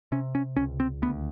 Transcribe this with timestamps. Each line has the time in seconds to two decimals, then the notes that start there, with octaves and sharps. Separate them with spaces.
0.12 C3 C#4
0.35 C#4
0.56 C#2 C#4
0.80 C4
1.02 D2 B3